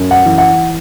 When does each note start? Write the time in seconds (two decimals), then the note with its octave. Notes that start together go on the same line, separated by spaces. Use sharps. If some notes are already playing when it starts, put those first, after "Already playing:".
Already playing: F#2
0.11 F#5
0.26 E3
0.38 F#5